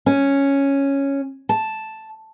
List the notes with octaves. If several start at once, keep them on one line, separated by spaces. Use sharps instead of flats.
C#4
A5